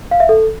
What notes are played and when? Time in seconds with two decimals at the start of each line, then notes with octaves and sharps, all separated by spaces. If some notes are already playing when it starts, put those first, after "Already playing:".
0.11 F5
0.20 E5
0.29 A4